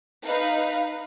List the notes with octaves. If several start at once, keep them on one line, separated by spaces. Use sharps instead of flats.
D#4 B4 F5